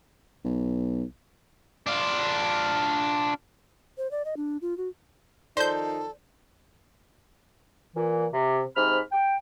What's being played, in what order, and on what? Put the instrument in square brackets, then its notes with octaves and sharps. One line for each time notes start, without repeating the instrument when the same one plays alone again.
[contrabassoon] B1
[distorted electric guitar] D4 F4
[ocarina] C5
D5
D#5
D4
F4
F#4
[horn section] D#3 F3 D#4 [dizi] A4 [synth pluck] C5 G6 [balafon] D5
[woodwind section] A#2 E3
C3
G#2 C3 B5 F6
G5